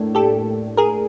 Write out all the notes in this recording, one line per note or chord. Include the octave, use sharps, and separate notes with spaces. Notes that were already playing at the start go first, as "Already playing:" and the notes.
Already playing: A2 A#3 D4
G4 A4
G#4 A#4